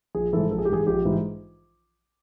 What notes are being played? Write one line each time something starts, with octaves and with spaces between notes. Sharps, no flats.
A#1 G#4
G#2 E3 A4
A#1 A4
G#4
G4
G#2 E3 G#4
A#1 G4
G#2 E3